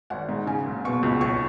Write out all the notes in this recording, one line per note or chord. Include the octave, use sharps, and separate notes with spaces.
G#1 F#5
G#2
C#3 G#5
F#1
B2 C#6
C#2
B1 C#6